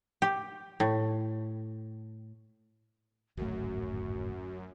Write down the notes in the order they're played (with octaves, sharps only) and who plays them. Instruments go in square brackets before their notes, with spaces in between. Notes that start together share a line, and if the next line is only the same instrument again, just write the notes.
[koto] G4
A2
[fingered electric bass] D1 G#1 A3 [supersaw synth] F#2 [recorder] F#4